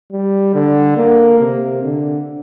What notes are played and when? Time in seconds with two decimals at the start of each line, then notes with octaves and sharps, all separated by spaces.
0.12 G3
0.54 D3
0.97 A#3
1.40 C3
1.83 D3